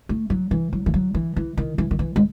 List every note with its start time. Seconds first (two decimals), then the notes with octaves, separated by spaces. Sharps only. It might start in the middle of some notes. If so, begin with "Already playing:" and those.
0.09 A3
0.30 F#3
0.51 E3
0.73 F#3
0.86 E3
0.94 F#3
1.14 E3
1.36 E3
1.57 D#3
1.78 E3
1.91 D#3
1.99 E3
2.16 G#3